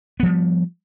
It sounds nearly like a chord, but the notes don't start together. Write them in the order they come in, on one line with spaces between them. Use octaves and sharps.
B3 F3 G3